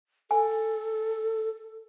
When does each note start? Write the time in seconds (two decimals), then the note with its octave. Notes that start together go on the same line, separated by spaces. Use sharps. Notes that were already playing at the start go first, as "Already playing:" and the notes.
0.31 A4 G#5